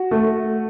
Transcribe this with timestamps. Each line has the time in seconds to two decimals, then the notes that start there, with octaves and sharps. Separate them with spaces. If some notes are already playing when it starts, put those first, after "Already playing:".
Already playing: F#4
0.11 A3